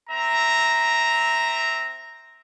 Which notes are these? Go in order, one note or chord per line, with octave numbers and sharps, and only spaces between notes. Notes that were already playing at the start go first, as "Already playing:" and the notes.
C4 E5 A#5